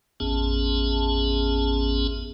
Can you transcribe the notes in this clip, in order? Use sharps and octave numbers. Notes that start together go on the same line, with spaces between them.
A1 F2 B3 C#4 G#4 A5